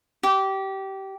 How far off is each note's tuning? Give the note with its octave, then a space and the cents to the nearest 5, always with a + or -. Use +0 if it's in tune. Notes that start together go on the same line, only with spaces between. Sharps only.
G4 -20